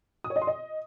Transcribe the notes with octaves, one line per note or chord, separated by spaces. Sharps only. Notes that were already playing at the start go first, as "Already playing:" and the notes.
D#6
C#5
D#5
C6
D#5